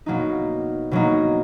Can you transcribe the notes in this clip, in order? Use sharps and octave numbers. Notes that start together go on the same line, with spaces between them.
B2 F#3 A#3 D#4
B2 F#3 A#3 D#4